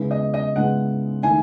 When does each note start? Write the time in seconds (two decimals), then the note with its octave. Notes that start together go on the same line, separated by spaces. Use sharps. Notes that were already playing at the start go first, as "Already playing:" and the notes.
Already playing: C#3 G#3 B3 E4
0.11 D#5
0.34 D#5
0.56 C#3 G#3 B3 E4 F#5
1.23 D#3 A3 E4 G#5